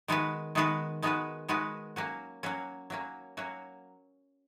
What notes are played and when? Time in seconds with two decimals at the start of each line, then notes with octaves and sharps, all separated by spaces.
0.08 D#3 G#3 B3 F#4 B4
0.55 D#3 G#3 B3 F#4 B4
1.02 D#3 G#3 B3 F#4 B4
1.49 D#3 G#3 B3 F#4 B4
1.96 F#3 A#3 C#4 F#4
2.43 F#3 A#3 C#4 F#4
2.90 F#3 A#3 C#4 F#4
3.37 F#3 A#3 C#4 F#4